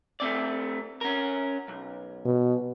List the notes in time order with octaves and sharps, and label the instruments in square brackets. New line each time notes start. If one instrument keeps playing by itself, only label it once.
[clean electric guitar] A3 C4 D5
C#4 A#4
B1
[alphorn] B2